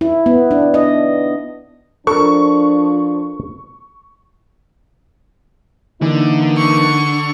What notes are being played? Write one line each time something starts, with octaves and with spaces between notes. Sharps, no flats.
E4
B3
D4
D#5
F3 D4 A4 A#4 C#6
D3 E3 A#3 D#4
C#6